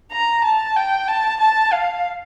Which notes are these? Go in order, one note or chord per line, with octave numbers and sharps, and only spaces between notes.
A#5
A5
G5
A5
A5
F5